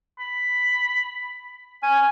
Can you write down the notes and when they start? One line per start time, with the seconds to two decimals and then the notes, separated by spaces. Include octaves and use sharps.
0.19 B5
1.83 C#4 G#5